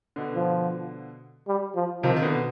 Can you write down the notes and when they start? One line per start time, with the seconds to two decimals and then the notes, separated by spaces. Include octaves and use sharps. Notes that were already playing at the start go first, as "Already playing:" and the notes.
0.16 B2 D3
0.35 F3
1.47 G3
1.75 F3
2.03 C3 D#3 F3
2.16 D#3
2.22 B2 D3